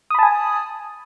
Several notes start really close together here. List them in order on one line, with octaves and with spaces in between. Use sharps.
D#6 B5 A5 G#5